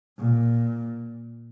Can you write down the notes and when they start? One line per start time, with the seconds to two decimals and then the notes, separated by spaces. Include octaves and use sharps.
0.19 A#2